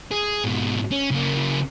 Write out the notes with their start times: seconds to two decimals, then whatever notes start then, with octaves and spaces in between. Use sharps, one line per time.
0.12 G#4
0.45 G#2 B2
0.92 C#4
1.11 C#3 A#3